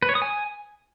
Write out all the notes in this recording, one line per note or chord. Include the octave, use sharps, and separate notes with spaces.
B4
C#5
D#6
G#5